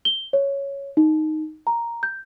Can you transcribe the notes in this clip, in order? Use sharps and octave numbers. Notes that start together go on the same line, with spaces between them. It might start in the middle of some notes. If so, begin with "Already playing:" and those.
G7
C#5
D#4
A#5
G6